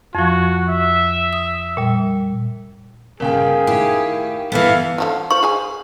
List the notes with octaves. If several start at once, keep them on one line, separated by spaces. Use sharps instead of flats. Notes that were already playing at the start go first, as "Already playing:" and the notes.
F2 F3 F#4
E5
D#6
A#2 G3
G1 C#3 G#4 A#4 F5 G5
A2 D#3 G4
G1 E3 G3 B3 A4 E5 F5
D3 F3 F#3
F4 C5 C#6
G#4 F5 G#5